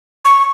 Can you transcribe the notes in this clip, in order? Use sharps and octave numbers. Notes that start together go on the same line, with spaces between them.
C#6